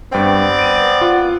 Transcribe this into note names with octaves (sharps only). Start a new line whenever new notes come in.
G2 B3 C4 D5 G5
D7 D#7
F4 F#5